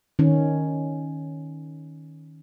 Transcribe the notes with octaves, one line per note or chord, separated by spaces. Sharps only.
D#3 C#4